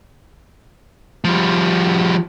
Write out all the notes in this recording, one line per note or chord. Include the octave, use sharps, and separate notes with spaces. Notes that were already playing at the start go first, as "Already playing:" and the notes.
F3 G3